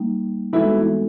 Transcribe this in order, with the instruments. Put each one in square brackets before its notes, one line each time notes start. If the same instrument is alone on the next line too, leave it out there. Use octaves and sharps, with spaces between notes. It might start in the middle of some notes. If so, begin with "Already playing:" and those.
Already playing: [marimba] G3 A#3 D#4
[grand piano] E3 E4 [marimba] G#3 B3 D#4 F#4 A4